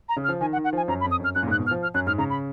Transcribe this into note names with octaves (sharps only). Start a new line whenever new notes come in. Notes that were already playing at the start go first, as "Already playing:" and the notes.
A#5
C#3
F6
F3
D#3 G#5
F#5
D#3
F#5
F3 G#5
F#2 A#5
B5
F2
D#6
F#2 F6
F#2 F#6
A#2
G#2 F#6
B2
F6
F3
F6
F#2 F#6
G#2 F6
C#3 A#5
B5